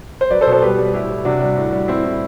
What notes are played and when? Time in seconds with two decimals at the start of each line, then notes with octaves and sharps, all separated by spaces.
0.21 C5
0.31 F#3 B4 D5
0.41 A4 C5
0.47 B2
0.52 A4 C5
0.62 G3 G4 B4
0.79 G3
0.94 A2 E4 G4
1.09 A2
1.25 C3 D4 F#4
1.41 G3
1.57 A2
1.73 G3
1.88 A2 C4 E4
2.04 A2